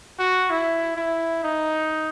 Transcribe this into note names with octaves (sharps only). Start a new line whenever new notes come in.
F#4
E4
E4
D#4